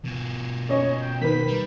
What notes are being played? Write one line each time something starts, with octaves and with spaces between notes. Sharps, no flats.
B2 F4
C#4 C#5 D#5
G5
D#3 B4 B6
G3